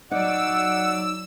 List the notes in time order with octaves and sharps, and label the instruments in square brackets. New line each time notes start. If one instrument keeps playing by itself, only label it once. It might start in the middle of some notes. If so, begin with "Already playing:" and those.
[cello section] F#3 D5 [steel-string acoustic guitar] D#4 [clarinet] F#5 [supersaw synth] E6